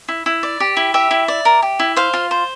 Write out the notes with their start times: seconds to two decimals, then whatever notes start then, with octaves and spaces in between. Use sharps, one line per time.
0.08 E4
0.26 E4
0.43 D5
0.60 G4
0.77 E4
0.94 G4 E5
1.11 E4
1.28 D5
1.45 A#4
1.62 G4
1.79 E4
1.96 C5 F5
2.14 F4
2.31 C5